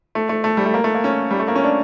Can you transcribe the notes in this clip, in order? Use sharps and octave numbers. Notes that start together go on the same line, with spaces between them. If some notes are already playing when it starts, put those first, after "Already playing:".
A3
A3
A3
G3
A3
A#3
A3
A#3
C#4
G3
A3
A#3
C#4
D4